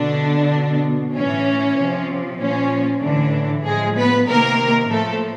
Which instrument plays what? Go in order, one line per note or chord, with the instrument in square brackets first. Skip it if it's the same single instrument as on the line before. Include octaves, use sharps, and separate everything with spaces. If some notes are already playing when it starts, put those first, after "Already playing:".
Already playing: [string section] B2 D3 D4
B2
A2 E3 C#4
C3 F3
A#2 F3 C#4
A2 D3 E3 D4
A2 F3 G#3 G#4
B3 B4
C3 D#3 A#3 A#4
A2 F3 A3 A4